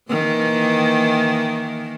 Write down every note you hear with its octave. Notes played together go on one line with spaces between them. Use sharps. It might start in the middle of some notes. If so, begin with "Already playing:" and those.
D#3 E3 A#3